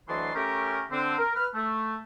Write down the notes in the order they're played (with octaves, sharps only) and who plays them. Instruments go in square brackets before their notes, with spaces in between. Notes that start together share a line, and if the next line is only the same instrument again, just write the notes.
[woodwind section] D2 E3 F#3 D#5 A5 C6
A3 C#4 G4 A#4
D3 C4
A#4
B4 F6
A3